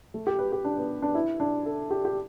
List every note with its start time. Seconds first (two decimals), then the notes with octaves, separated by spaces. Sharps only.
0.14 A3
0.27 G4
0.39 B4
0.52 G4
0.64 D4
0.78 B3
1.02 D4
1.15 E4
1.40 D4
1.66 A4
1.91 G4
2.05 G4